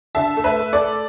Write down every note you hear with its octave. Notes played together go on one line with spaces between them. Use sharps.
D3 E5 A5
A3
B4 E5
A3
A4 D5
A3